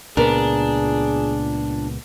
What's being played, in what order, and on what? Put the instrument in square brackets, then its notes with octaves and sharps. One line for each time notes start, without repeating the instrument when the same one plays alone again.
[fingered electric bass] C#2 A#2 B3 [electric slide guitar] D4 [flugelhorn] G#4 [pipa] A#4